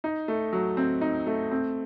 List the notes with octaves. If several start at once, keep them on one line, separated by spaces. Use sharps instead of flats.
D#4
A3
F#3
C4
D#4
A3
C4